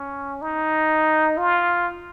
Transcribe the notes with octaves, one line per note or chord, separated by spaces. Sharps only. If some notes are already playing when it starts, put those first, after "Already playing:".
Already playing: C#4
D#4
F4